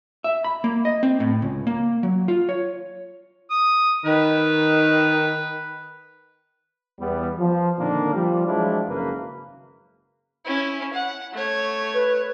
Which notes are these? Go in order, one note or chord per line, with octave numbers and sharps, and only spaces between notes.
E5
B5
A#3
D#5
C4
A2
C#2
A#3
F#3
F4
C#5
D#6
D#3 B4
E2 G3 B3
F3
A#2 D3 D#3 A#3 C4 D4
F3 G3
F3 F#3 G#3 D4 E4 F4
G#1 F#2 C#3 A#3 B4
C#4 E4
F#5
A3 C#5
B4